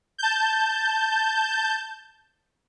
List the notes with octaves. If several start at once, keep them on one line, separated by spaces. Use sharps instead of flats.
A5 G6